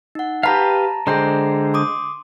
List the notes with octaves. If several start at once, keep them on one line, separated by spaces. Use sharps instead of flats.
D#4 F#5
G4 B4 F5 A5 A#5
D3 G#3 G#4 C5 G5 A#5
C6 D6 D#6